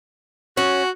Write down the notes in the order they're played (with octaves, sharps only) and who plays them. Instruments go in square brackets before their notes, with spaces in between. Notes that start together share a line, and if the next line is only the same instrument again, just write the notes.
[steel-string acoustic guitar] C#4 [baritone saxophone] F#4